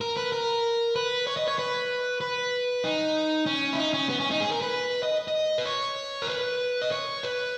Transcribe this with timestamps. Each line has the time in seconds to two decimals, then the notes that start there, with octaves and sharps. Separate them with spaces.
0.01 A#4
0.17 B4
0.32 A#4
0.96 B4
1.27 C#5
1.37 D#5
1.48 C#5
1.59 B4
2.21 B4
2.84 D#4
3.46 C#4
3.73 E4
3.78 D#4
3.94 C#4
4.09 B3
4.20 C#4
4.31 D#4
4.40 G#4
4.52 A#4
4.61 B4
5.03 D#5
5.28 D#5
5.58 B4
5.66 C#5
6.22 A#4
6.28 B4
6.82 D#5
6.91 C#5
7.23 B4